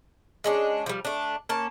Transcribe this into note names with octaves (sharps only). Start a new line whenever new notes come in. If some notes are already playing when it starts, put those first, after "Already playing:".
G#3 C#4 D4
F3 G3
A3 D4
A#3 C#4 A5